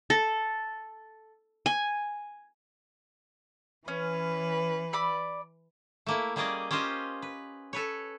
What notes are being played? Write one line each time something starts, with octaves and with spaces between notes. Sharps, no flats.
A4
G#5
E3 C#4 B4
D5 B5 E6
A3 A#3 E4
G3 A#3 C#4 G#4 D5 D#5
C#4 F4 G4 C5 D#5
B4
A4 B4 C#5